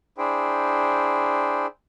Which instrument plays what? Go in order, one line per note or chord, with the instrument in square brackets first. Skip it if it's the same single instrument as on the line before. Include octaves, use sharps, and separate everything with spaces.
[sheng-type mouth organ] D4 E4 G#4 C5 G5